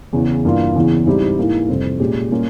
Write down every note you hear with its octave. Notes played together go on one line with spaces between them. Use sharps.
E2 C#3 E3
G2 E3 A#3 F4
E2 C#3 E3
G#2 G3 C4 E4 G4
G#2 E3 A#3 E4
F2 C3 E3 G3 C4
A#2 G#3 C#4 G4
A#2 G3 A#3 C#4 F4